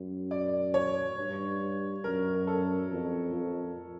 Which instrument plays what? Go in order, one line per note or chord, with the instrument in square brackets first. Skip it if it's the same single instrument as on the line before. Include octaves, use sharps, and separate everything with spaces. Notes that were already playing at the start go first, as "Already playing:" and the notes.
Already playing: [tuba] F#2
[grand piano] D5
C#5
[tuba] G2
[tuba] F#2 [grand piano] A#4
[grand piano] A4
[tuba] F2
F2